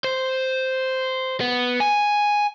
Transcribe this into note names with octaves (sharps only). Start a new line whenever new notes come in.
C5
B3
G#5